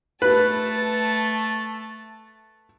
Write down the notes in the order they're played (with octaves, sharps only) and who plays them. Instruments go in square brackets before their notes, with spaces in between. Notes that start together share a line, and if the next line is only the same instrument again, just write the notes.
[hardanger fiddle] A3 A5 [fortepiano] B4